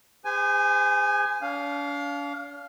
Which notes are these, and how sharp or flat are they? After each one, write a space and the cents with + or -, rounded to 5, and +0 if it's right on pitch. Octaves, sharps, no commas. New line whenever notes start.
G#4 -40 C5 -40 G#5 +0
D4 -45 F5 +0